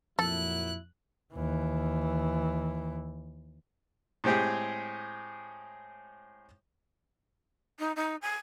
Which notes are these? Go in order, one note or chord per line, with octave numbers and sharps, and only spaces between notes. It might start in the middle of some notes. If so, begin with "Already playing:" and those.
F2 A#2 F#3 E4 A4 F#6
D#2 E3
A2 G#3 C4 G4 G#4
D#4
D#4
G#5